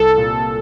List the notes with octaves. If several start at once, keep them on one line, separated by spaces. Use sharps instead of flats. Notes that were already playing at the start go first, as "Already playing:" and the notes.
Already playing: C2 A4
A#2